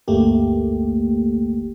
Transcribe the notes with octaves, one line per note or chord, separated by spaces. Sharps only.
G1 D2 A3 A#3 G4